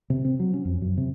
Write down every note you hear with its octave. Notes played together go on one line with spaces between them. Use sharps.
C3
C4
F#3
C#4
F2
F#2
C3